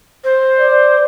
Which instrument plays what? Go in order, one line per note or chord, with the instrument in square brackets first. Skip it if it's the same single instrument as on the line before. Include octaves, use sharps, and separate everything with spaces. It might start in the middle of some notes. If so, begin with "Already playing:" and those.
[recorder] C5
[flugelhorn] D5